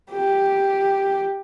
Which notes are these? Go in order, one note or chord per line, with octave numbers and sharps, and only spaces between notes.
G4